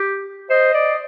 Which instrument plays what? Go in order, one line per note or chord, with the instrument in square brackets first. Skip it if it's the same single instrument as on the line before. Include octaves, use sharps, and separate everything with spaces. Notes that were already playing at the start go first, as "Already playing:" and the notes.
Already playing: [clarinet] G4
[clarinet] C5 [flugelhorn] D#5
[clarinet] D5